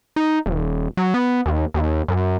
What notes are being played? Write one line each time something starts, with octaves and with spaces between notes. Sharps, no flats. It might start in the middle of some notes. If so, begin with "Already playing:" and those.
D#4
D#1
F#3
B3
D#2
D#2
F#2